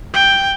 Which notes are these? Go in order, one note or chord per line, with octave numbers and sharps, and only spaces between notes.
G5